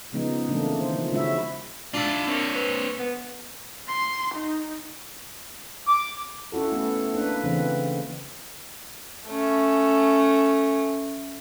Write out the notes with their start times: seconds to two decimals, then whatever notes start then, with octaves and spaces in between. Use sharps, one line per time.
0.13 C#3 F3 G#3 B3 D#4
0.48 C#3 E3 A3 A#3 D4
0.79 D#3 C5
0.95 F3
1.12 C#3 G#3 C#4 E4 F#4 E5
1.94 D4 F4 E5
2.28 A#3 C4 C#5
2.55 B4
2.99 B3
3.88 C6
4.35 D#4
5.87 D6
6.52 C#4 E4 F#4 A4
6.72 A3 B3
7.14 A#3 D4 B4
7.44 C#3 E3 C4
9.27 A3 C#4